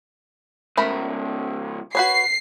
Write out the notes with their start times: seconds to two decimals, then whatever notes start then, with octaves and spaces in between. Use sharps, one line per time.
0.77 G#2 C#3 A3 A#4 B5
1.95 F#4 B4 C#5 C7